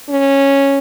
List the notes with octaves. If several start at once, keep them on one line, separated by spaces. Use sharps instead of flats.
C#4